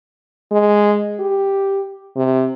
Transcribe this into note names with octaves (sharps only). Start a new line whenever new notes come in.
G#3
G4
C3